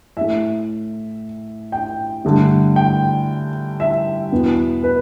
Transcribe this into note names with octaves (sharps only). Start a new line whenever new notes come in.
A2 A3 E5
G5
G2 D3 A3
G5
E5
E2 B2 B3
B4